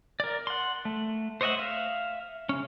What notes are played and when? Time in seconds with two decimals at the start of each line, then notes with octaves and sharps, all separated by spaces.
0.20 A#4 D5
0.47 F#5 C6
0.85 A3
1.41 C5 C#5 D#5 E5 F#5
1.59 E5 F5
2.49 C#3 C#4